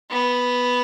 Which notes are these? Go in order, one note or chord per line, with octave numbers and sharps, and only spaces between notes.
B3